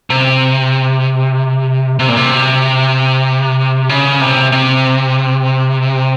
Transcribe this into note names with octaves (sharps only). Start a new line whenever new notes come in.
C3
C3
A#2
C3
C#3
C3
C3